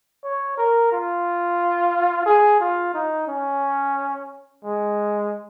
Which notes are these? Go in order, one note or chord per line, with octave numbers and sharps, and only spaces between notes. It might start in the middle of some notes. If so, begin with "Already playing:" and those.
C#5
A#4
F4
G#4
F4
D#4
C#4
G#3